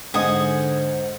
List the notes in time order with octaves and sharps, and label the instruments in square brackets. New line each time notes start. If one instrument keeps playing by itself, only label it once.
[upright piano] G#2 D#5 [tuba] D3 [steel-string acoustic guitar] C5 F#5 [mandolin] G#5 D#6